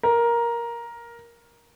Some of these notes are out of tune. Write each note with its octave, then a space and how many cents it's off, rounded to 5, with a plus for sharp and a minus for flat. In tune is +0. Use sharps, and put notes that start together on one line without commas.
A#4 +10